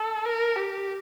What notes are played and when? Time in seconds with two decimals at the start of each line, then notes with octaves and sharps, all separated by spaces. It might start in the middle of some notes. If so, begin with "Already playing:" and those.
Already playing: A4
0.25 A#4
0.56 G4